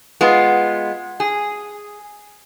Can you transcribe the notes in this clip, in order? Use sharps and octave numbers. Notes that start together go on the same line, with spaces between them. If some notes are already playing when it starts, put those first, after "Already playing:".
G#3 B3 F4
G#4